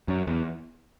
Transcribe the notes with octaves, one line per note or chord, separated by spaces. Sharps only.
F#2
E2